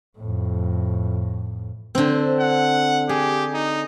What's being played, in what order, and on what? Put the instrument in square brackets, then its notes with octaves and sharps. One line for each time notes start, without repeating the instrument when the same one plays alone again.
[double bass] F2 A2
[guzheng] D3 C4
[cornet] F#5
[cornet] G4 [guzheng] G#4
[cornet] D#4